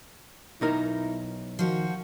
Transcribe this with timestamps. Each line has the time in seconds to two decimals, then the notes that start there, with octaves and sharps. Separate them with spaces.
0.61 B1 D#4 E4 A#4
1.59 D#3 F3 F#4